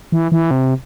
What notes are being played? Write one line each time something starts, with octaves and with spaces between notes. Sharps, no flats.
E3
E3
C3